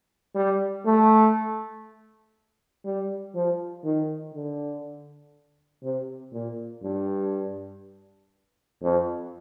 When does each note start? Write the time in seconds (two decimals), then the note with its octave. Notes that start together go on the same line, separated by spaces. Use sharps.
0.36 G3
0.86 A3
2.85 G3
3.35 F3
3.84 D#3
4.34 D3
5.83 C3
6.33 A#2
6.83 G2
8.82 F2